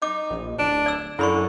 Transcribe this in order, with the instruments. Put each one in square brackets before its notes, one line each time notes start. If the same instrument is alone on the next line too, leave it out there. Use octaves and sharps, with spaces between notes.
[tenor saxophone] D#4 [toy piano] D6
[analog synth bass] A#1
[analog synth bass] D1 [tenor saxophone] D4
[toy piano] D5 E6
[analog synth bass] F#2 [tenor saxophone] D3 [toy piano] E4 B5 C#6